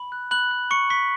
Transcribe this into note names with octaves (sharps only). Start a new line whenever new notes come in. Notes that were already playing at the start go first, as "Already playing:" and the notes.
Already playing: B5
F#6
B5 F#6 F#7
F#6
C#6 F#6 C#7
C#6 B6